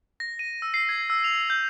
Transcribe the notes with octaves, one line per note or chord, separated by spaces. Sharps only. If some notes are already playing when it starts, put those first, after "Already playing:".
A#6
D#7
E6
C7
G#6
E6
F7
G6